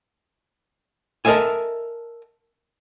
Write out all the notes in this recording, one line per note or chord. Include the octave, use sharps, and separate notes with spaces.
A4 A#4 C#5 D#5 E5 G#5